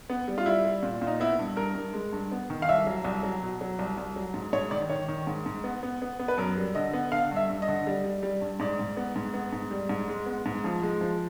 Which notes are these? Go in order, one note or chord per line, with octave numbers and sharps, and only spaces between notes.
B3
G3
F4
G3 E4
G3
A#2
A#2
D#4
B3 E4
G2
G2 A#4
G2
G#3
G2
B3
D#3
F5
C2 E5
F#3
C2
F#3
B2
F#3
C2
C2
F#3
G#2
G#2 C#5
D#3 D5
D#3 C#5
D#3
G#2
G#2
B3
B3
B3
B3
B4
F#2 A#4
G3
D3 D#5
B3
D3 F5
G2 E5
G2
D#5
D3
G3
G3
G3
G2
G#2 D5
G#2
B3
G#2
B3
G#2
G3
G#2
G#3
B3
G#2
F3
G#3
F3